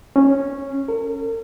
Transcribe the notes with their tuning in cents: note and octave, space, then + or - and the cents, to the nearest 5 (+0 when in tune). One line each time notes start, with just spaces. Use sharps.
C#4 -10
A#4 -45